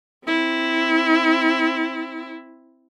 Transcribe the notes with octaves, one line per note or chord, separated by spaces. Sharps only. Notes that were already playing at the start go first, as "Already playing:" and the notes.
C4 E4